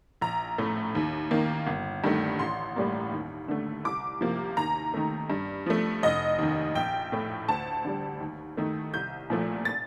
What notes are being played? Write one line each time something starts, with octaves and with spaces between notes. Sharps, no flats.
A#1 A#5
A2 A3
D#2
D#3 A#3
G1
G2 D#3 A3
A1 C6
A2 G3 A#3
D#2
D3 A3
C2 D6
C3 F3 A#3
D#2 A#5
D#3 A3
G2
F3 A3
F1 D#5
D#2 D#3
A#1 G5
A2 A3
D2 A5
D3 G3
D#2
D#3 A3
C2 G6
A#2 F3 A3
A6